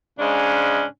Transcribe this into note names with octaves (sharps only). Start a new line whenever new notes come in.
G#2 C#3 G#3 C#4 D4